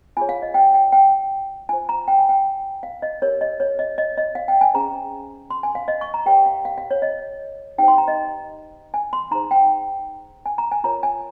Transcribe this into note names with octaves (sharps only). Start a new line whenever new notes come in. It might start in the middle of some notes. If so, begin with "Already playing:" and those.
F4 G#4 C#5 G#5
F5
D#5
G5
G5
G5
F4 C5 G#5
A#5
G5
G#5
G5
F5
D#5
G4 A#4 C#5
D#5
C#5
D#5
D#5
D#5
F5
G5
G#5
C#4 G#4 C5 A#5
C6
G#5
F5
D#5
C#6
A#5
G4 A#4 C#5 G5
F5
F5
F5
C#5
D#5
D#4 G4 C5 G5
C6
A#5
D#5
G#5
C6
D#4 G#4 C5 A#5
G5
G#5
A#5
G#5
F4 A#4 C#5 A#5
G#5